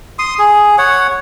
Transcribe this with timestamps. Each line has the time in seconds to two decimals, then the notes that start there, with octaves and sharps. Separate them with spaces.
0.19 C6 D#6
0.39 G#4
0.78 C#5 F#5